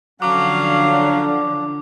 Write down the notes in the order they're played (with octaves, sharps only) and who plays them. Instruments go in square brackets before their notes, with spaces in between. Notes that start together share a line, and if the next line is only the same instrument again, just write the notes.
[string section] D3 F3 [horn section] F#3 C#4 F5 [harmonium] D4 [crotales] D6